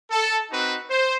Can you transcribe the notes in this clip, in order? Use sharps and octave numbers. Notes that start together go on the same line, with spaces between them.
A4
C4 D#4 F#4 B4
C5